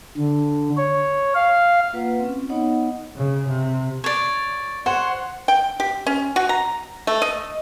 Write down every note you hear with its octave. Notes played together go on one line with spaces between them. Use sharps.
D3
C#5
F5
A#3 F4 B4 F#5
C4 C#4
B3 D#4 C#5 D#5 F#5
C#3
C3
C#5 D5
C5 C#5 F#5
G5
G4
C#4
F#4
A#5
A3
D#5